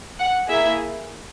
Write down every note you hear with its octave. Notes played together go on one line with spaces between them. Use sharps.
F#5
A#3 E4 G#4 E5